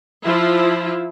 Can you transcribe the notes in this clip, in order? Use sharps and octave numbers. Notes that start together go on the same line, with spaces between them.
F3 E4 F4